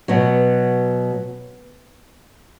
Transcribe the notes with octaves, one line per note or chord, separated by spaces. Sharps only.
B2 F#3 B3